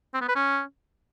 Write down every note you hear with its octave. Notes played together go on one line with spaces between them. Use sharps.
C4
B3
B4
C#4